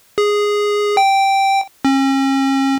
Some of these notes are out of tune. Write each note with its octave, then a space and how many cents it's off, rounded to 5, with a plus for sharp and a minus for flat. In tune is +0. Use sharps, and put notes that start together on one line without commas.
G#4 -5
G5 -5
C#4 -40